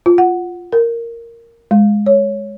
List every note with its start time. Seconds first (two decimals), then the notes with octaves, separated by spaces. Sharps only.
0.06 F4
0.18 F#5
0.72 A#4
1.71 G#3
2.06 C#5